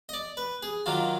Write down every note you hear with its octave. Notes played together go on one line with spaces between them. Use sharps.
D#5
D5
B4
G#4
D#3 F#3 D4 F4